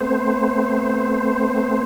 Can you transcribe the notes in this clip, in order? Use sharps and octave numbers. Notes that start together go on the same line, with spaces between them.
A3 B3 C4 C5